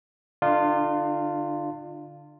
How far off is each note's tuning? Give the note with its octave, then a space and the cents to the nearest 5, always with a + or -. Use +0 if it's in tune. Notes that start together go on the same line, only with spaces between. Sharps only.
D3 +0 D4 +40 F4 +0